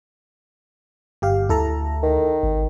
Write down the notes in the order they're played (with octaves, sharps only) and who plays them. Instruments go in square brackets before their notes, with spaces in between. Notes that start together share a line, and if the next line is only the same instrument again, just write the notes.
[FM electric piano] G1 G4 F5
[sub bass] D2 [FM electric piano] E4 A4 A#5
[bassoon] D#3
[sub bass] G#1